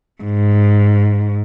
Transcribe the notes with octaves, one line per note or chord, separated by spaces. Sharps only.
G#2